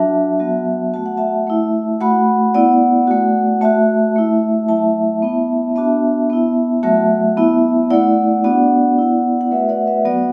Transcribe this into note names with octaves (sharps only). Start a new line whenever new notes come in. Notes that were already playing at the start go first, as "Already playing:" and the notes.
Already playing: F#3 D4 F#4 E5 A5
F#3 B3 F#4
A3 F#4 A5
F#5
E5 A5
A3 E4
A3 F#4 F#5 B5
B3 E4 D5 F#5
A3 F#4
A3 F#4 E5 A5
A3 E4
F#3 A3 E4 E5 A5
B3 E4
B3 D4 F#4 E5 A5
B3 E4
F#3 A3 F#4 E5 A5
B3 E4
A3 E4 D5 F#5
B3 D4 F#4 D5 F#5
B3 E4
F#5
A3 F#4 B4 E5
D5 F#5
B4 E5
F#3 B3 F#4 D5 F#5